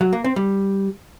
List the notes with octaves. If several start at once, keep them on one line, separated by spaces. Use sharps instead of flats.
F#3
A#3
C4
G3